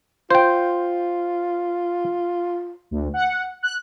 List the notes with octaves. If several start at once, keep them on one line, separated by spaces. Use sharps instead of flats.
F4 C5 G5
D2
F#5
F#6